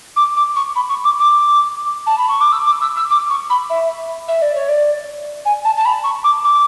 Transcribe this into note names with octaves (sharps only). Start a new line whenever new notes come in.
D6
D6
C#6
B5
C#6
D6
D6
A5
B5
C#6
D6
E6
D6
E6
E6
D6
C#6
B5
E5
E5
D5
C#5
D5
G#5
A5
A5
B5
C#6
D6
D6